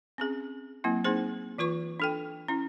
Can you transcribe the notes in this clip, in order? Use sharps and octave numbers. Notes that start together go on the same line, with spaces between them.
C4 C#4 G#4
F#3 A#3 C4 E4
A#3 C4 D#4 G#4 C5
E3 F4 B4 C#6
D4 A4 G5
C#4 E4